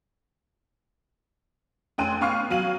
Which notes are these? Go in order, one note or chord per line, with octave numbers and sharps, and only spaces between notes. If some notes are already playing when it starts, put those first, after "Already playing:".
F1 C#4 G5 C6 F#6 D#7
B3 F5 C#6 F6 C7
F#3 F5 D#7 F#7